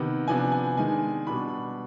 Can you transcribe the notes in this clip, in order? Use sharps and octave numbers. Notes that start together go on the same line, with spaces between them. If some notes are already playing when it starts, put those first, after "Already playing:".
Already playing: C3 D#3 B3
C3 F3 B3 D4 G#5
G#5
D#3 G#3 D4 G#5
B2 G3 D4 B5